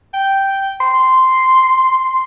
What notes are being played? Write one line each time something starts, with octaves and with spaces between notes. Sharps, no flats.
G5
C6